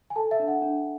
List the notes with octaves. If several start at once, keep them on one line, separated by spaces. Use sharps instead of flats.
G#5
A4 A5
E5
D4
F#5
D4